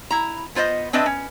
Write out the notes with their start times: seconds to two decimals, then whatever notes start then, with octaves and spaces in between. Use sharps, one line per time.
0.11 E4 A#5
0.55 B3 F4 C5 D5 D#5
0.93 C4 D4 B4 D#5 E5 A5
1.06 C#4